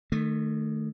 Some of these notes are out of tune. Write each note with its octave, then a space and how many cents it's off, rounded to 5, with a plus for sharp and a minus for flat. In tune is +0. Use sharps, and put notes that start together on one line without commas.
D#3 -25 A3 +0